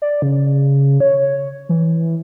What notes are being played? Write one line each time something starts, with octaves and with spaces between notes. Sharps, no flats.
D5
C#3
C#5
E3